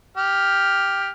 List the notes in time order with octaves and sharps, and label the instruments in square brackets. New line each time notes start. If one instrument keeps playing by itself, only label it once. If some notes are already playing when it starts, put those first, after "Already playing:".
[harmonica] G4 F6